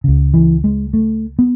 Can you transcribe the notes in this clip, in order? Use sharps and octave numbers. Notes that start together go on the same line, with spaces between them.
C#2 C#3
E3
G#3
A3
B3